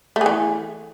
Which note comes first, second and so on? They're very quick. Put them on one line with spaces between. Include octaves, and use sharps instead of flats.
A3 G#4 E3